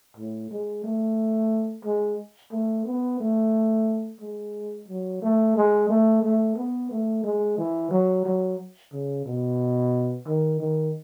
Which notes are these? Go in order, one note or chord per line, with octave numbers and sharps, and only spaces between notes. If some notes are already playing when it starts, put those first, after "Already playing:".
A2
G#3
A3
G#3
A3
B3
A3
G#3
F#3
A3
G#3
A3
A3
B3
A3
G#3
E3
F#3
F#3
C#3
B2
D#3
D#3